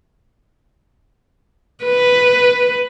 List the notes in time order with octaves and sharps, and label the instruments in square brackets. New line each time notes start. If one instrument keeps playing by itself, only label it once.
[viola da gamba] B4